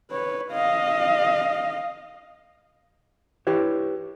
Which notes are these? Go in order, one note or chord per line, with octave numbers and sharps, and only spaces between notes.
B4 C#5
D#5 F5
E4 G4 B4 C#5